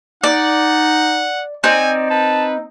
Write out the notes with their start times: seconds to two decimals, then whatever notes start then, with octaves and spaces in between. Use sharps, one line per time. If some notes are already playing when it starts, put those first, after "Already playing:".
0.24 D#4 D5 F#5
1.64 C4 D#4 D5 G#5
2.10 B4 A5